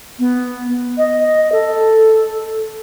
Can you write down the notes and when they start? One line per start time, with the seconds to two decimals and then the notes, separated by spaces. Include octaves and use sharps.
0.19 B3
0.97 D#5
1.52 A4